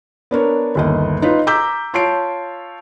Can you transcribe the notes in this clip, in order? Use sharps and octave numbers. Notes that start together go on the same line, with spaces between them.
B3 D4 A#4 C#5
G1 D#2 D#5
D#4 F4 B4
A#5 D6 E6 G6 B6
F4 C#5 A5 C7 D7